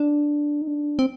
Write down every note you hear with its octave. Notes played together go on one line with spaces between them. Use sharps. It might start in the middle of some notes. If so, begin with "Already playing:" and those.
Already playing: D4
D#4
D4
C4